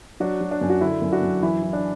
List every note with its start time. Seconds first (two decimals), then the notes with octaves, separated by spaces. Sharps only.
0.20 F#3 D4 F#4
0.41 F#3
0.51 D4
0.61 F#2
0.69 F#4
0.81 D3 E4
1.02 F#2
1.12 D4 F#4
1.22 F#2
1.43 E3 E4
1.63 E3
1.73 D4